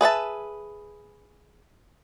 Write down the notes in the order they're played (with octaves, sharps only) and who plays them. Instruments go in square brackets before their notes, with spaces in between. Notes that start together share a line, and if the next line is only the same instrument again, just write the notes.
[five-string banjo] G#4 B4 E5 A5